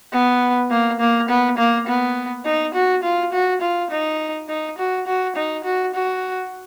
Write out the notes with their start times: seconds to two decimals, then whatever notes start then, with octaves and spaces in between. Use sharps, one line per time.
0.13 B3
0.70 A#3
1.00 A#3
1.29 B3
1.57 A#3
1.87 B3
2.45 D#4
2.74 F#4
3.03 F4
3.33 F#4
3.61 F4
3.91 D#4
4.49 D#4
4.78 F#4
5.07 F#4
5.36 D#4
5.65 F#4
5.94 F#4